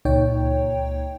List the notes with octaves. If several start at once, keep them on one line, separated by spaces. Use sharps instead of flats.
C#2 A#2 D#4 C#5 G5